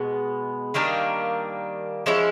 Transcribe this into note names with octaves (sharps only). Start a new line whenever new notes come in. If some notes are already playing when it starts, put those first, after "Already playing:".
Already playing: B2 G#3 B3
D#3 G3 A#3 D4
F3 G#3 C#4 E4